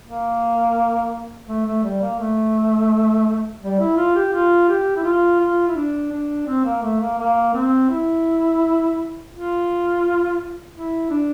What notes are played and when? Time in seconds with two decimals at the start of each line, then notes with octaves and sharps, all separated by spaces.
0.06 A#3
1.48 A3
1.66 A3
1.84 G3
2.01 A#3
2.19 A3
3.62 G3
3.79 E4
3.97 F4
4.15 G4
4.33 F4
4.69 G4
4.96 E4
5.04 F4
5.40 F4
5.68 E4
5.76 D4
6.12 D4
6.47 C4
6.65 A#3
6.82 A3
7.00 A#3
7.18 A#3
7.54 C4
7.90 E4
9.32 F4
10.75 E4
11.10 D4